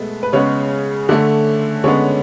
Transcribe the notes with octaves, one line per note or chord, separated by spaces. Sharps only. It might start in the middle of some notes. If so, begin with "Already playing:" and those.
Already playing: B2 G#3 A3 B3
B4
C#3 G#3 B3 C#4 C#5
D3 A3
D3 G#3 B3 C#4 C#5